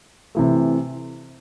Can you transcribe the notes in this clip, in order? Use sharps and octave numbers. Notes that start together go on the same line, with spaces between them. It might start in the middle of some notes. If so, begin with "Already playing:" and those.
C3 E3 A3